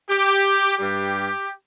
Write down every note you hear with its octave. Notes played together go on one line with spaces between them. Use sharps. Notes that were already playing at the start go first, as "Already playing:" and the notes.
G4
G2 G3 G4